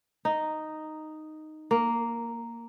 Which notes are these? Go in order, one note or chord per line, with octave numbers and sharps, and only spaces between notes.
D#4
A#3